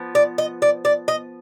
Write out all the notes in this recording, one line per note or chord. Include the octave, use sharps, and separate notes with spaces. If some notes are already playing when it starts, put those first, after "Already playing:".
Already playing: F3 B3
D5
D#5
D5
D5
D#5